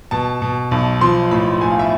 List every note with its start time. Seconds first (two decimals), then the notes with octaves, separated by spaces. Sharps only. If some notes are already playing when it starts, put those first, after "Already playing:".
0.11 B2 A5
0.42 B2
0.71 B1
1.01 F3 C6
1.31 A2 B5
1.61 A2 G#5
1.70 F5
1.79 E5